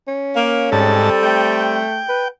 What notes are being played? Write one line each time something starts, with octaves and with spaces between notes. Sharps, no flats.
C#4
A#3
G#2 G3 C4 A4 A5
A3 G5
B4